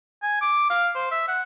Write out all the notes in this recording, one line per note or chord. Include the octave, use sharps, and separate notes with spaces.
G#5
D6
F5
C5
E5
F#5